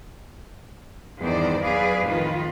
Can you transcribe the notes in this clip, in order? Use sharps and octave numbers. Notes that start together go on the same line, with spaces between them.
E2 G2 D#3 C5 D5
E2 F#3 G#4 B4 D5 F5
F2 A2 D#3 F4 B4